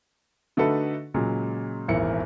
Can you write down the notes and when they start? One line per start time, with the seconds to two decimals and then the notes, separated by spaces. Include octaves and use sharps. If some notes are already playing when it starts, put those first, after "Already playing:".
0.57 D3 A3 D#4 F#4 A4 B4
1.14 A#2 C#3 F#3 G#3
1.88 D#1 G#1 E2 E4 A#4 C#7